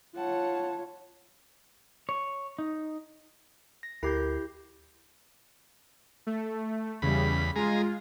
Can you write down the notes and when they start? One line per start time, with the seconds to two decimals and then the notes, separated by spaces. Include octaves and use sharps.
0.15 F4 C#5 F#5 A5
2.09 C#5
2.59 D#4
3.83 A#6
4.03 D2 E4 G4 A#4 G6 C7
6.27 A3
7.02 E2 C#3 G3 B5
7.56 G#3 F4 G#4 A#5